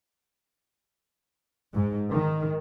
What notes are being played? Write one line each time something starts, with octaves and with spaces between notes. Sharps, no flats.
G#2
D#3